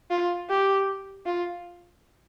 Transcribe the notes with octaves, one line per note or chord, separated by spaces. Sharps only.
F4
G4
F4